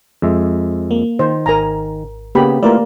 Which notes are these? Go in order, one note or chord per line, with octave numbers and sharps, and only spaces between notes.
F2 G#3 E5
A#3
D#3 C5
G#1 A#4 G#5 A#5
C#3 A#3 B3 G4 B5
A3 A#3 E4 F4 A#4 B4 D5